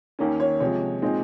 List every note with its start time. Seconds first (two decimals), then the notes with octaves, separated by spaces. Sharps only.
0.19 D#2 D#3 A#3 C#4
0.40 C#5
0.60 C3 F3 G#3 C#5
1.02 A#2 G#3 C4 D#4